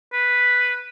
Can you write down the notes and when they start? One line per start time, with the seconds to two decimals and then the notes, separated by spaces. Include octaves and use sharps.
0.13 B4